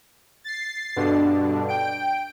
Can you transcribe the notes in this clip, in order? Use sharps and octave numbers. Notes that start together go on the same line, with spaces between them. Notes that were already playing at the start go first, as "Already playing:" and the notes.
A6 C7
G2 B2 D3 D4
G5 D7